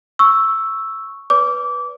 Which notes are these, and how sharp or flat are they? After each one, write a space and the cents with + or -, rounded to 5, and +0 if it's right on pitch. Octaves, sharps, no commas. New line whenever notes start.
C#6 +0 E6 +0
B4 -5 D5 -40 D6 -25